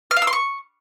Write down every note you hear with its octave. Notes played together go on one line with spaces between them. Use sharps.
F6
F5
E6
C6
C#6